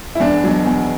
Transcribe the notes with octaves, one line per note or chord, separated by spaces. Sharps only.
E4
E2 D4
B2 F#3
E2